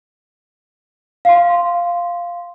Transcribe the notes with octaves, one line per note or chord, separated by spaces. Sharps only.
F5 C6